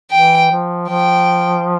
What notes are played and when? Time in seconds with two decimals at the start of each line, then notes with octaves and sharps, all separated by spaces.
0.11 E3 G5
0.51 F3
0.89 F3 G5